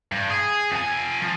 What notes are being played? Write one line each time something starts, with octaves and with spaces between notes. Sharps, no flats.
G2
G#4
F2 G#5
F3